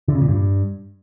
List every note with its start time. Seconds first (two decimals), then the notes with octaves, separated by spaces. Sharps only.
0.08 D3
0.15 C#3
0.22 A#2
0.28 G2